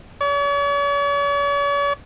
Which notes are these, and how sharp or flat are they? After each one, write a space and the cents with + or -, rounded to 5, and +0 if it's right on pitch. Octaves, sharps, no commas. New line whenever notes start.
C#5 +45